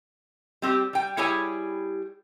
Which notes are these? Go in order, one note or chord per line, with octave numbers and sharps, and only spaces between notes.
G3 C4 G4
G3 G5
G3 E4 G4 G#4 C#5 G#5